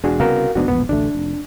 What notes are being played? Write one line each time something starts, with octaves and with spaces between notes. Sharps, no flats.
E1 D4 F#4 G#4
C2 C#3 B3 F#4 A#4 F5
F1 G#2 B3 D4 F#4
E1 A#1 B3
A1 D2 A3 D4
F1